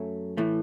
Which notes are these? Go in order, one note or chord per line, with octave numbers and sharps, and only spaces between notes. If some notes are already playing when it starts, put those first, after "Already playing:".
Already playing: F#2 F#3 A3
A2 E3 A3